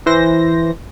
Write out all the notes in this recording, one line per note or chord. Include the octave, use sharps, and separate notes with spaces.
E3 C5 A#6